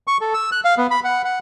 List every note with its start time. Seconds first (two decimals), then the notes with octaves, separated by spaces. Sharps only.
0.07 C#6
0.21 A4
0.34 E6
0.52 F#6
0.65 F5
0.78 B3
0.91 B5
1.04 F#5
1.24 F#5